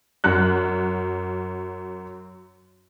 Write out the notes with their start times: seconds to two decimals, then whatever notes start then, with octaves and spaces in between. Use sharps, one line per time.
0.24 F#2 F#6